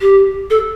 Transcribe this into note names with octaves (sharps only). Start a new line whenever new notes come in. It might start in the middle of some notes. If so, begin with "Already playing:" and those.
G4
A4